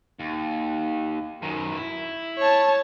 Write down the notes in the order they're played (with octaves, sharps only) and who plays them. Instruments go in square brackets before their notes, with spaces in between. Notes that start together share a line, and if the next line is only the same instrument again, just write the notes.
[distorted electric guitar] D#2
F#2 D#3
E4
[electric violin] C#5 A5